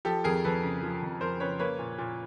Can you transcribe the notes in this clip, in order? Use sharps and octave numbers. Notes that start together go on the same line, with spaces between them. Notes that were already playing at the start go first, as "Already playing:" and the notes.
F3 G4 A4
F2 G#4 A#4
F2 A4 B4
C#3
F3
F2
F2 A#4 C5
C#3 B4 C#5
A#3 B4 C#5
A#2
A#2